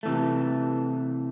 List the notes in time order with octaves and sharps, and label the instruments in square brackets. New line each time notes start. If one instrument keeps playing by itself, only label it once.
[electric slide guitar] C3 E3 A3